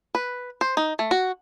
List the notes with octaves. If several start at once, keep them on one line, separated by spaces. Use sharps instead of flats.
B4
C5
D#4
A3
F#4